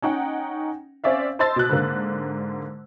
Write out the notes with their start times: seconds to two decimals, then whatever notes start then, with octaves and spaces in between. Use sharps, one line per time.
0.02 C#4 D#4 F#5 G5
1.04 C4 C#4 D5 E5 F5
1.39 C5 D#5 A5 C6 E6 A6
1.56 B2 F#6
1.69 G#2 D3 A#3